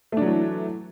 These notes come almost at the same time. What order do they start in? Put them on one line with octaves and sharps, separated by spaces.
A3 D4 F#3 E3